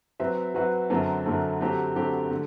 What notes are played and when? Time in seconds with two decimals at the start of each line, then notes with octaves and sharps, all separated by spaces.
0.19 F#3 C4 F#4 B4 E5
0.54 F#3 C4 F#4 B4 E5
0.90 F#2 D3 F#3 A3 C4
1.25 F#2 D3 F#3 A3 C4
1.60 D3 F#3 A3 C4 G4
1.96 D3 F#3 A3 C4 G4
2.31 D3